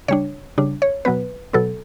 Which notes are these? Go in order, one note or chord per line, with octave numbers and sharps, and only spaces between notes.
C#3 G3 D4 C#5
C#3 G3 D4
C#5
B2 F#3 B3 B4
B2 F#3 B3 A4